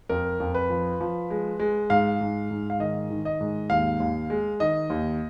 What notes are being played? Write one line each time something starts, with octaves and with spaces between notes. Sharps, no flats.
F2 A#4
F2
B4
F3
F3
G#3
G#3
G#2 F5
G#2
G#2
F5
D#3 D#5
D#3
D#5
G#2
D#2 F5
D#2
G#3
D#3 D#5
D#2